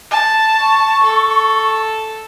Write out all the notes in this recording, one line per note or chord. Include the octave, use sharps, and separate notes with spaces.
A5
C#6
A4